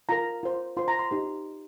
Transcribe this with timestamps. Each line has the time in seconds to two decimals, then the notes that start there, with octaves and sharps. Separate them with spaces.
0.09 F4 A#4 A#5
0.43 F4 C5
0.77 F4 C5 C6
0.88 A#5
0.99 C6
1.11 D#4 G4 C5